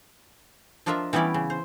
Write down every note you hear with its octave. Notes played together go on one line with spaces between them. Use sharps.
F3 D4 F4 A#4 D#5 E5
E3 G3 B3 C#4 E4 D5
C#3
C5